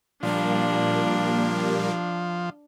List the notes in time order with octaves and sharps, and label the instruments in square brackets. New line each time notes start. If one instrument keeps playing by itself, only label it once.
[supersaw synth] A#2 G3 A#3 [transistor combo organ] F3 [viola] D4